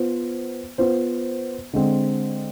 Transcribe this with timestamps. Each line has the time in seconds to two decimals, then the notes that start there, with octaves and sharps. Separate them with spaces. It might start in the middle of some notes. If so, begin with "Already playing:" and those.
Already playing: B3 F4 C5
0.78 B3 F4 C5
1.73 D3 G#3 C4